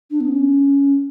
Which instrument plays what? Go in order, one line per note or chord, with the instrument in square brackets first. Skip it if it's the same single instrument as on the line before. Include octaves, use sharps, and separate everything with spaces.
[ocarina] D4
B3
C#4